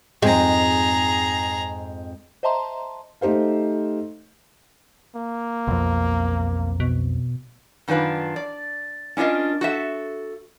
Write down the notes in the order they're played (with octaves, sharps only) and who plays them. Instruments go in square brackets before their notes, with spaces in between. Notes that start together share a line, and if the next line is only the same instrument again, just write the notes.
[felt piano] F2 G#2 G5 [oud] G#3 [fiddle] G#4 A#5
[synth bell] C5 D#5 E5 A5 A#5 C6
[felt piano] A3 D#4 G4 C5 F5
[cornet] A#3
[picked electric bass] B1 F2
[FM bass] B2
[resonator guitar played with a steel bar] F#2 D#3 D4 F4 B4 D5
D5
C#4 D4 F4 A#4 D#5
F#4 A4 E5